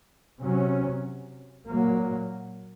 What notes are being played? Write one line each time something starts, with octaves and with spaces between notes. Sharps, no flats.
C3 F#3 C#4
A#2 F#3 A#3